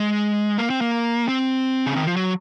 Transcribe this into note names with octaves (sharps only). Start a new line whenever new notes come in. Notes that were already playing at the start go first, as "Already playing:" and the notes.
Already playing: G#3
A#3
C4
A#3
C4
C#3
D#3
F3
F#3